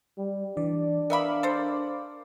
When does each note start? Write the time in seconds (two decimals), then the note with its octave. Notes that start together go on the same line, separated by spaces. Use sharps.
0.18 G3
0.57 E3 D4 D5
1.10 B3 A#4 E5 F5 B5 D6
1.43 A4 C5